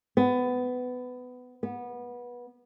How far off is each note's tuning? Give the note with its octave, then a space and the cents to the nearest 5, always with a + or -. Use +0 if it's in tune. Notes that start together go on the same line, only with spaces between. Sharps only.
B3 +20
B3 -20